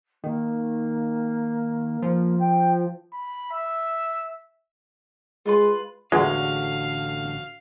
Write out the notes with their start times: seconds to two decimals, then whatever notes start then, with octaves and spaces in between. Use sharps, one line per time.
0.24 D#3 A#3
2.02 F3
2.39 G5
3.13 B5
3.52 E5
5.46 G#3 F4 B4 C6
6.12 A1 E2 D3 G#3 F#4 F5